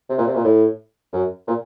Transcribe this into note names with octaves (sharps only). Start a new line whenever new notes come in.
C3
A#2
C3
A#2
A2
F#2
A#2